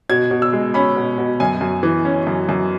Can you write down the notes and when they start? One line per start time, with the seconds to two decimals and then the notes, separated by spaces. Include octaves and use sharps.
0.10 B2 G#6
0.31 B2
0.42 E6
0.53 G#3
0.74 C#4 B5
0.96 B2
1.18 B2
1.40 F#2 G#5
1.61 F#2
1.83 E3
2.05 C#4
2.27 F#2
2.49 F#2